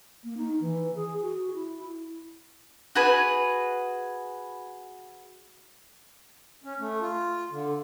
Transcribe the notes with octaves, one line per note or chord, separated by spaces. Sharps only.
A#3
D#4
E3
G#4
F#4
E4
F#4 G#4 B4
C#4
A3
F4
D3